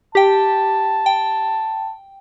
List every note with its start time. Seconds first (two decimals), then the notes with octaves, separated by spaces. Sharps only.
0.15 G4 G5 A5
1.06 G5